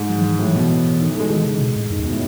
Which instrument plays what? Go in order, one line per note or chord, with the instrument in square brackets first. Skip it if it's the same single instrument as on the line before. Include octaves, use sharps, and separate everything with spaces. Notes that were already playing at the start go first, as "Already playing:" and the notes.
Already playing: [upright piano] G#2
[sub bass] F#3
E3
E3
[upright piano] A2 [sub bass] F#3
[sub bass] E3
[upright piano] B2
[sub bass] E3
[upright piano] D#3
E3
A3
G#3
[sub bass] D#3 [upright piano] G#3
[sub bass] C#3
B2
A2
[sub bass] F#2 [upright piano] D#3
[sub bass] E2
[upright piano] B2
A2